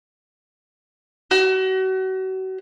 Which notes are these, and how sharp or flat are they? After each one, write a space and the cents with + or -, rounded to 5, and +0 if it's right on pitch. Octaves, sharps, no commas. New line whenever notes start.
F#4 +35